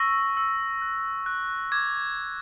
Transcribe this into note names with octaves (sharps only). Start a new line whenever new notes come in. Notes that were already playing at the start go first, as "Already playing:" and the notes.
Already playing: C#6 E6 A#6
E6
F#6
F#6
D6 G#6